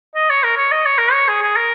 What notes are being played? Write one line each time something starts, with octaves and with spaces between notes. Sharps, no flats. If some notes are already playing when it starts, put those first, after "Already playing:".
D#5
C#5
A#4
C#5
D#5
C#5
A#4
C#5
G#4
G#4
A#4